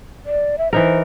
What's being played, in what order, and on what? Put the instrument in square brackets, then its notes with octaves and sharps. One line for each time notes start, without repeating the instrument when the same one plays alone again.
[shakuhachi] D5
E5
[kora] E3 D#4 A#4 [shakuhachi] C5